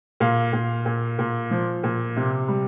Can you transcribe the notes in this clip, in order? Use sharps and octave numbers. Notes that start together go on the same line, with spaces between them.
A#2 F5
A#2
A#2
A#2
F3
A#2
C3
G3